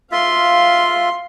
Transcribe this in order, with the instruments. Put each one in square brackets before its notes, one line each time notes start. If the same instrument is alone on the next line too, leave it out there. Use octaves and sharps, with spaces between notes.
[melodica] F4 E5 [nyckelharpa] F5 C6